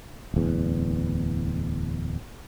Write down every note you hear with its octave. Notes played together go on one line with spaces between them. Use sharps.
D1 E2